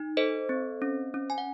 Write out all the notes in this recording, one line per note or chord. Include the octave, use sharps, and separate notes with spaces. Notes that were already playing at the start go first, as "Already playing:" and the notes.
Already playing: D#4
A4 C5 D#5
C4
C#4
C#4
G#5
F#5